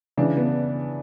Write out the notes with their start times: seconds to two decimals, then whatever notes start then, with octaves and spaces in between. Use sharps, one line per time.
0.17 C#3 E3 D4
0.37 B3